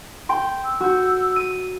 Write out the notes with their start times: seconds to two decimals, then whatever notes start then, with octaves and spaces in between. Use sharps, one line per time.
0.29 G5 C6
0.64 E6
0.80 F#4 G6
1.36 D#7